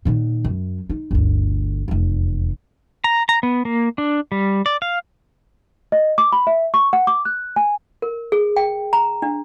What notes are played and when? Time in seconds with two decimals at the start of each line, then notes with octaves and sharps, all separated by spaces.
0.05 A#2 D#3
0.44 F#2
0.90 D#4
1.11 G1 D2
1.88 F1 E2
3.04 A#5
3.29 A#5
3.43 B3
3.65 A#3
3.98 D4
4.32 G3
4.66 D5
4.82 F5
5.92 D#5
6.18 D6
6.32 B5
6.47 E5
6.74 C#6
6.93 F#5
7.07 D6
7.25 F#6
7.56 G#5
8.02 A#4
8.32 G#4
8.56 G5
8.93 A#5
9.22 D4